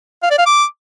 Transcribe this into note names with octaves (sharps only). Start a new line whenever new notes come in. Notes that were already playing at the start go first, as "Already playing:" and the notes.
F5
D5
F5
D6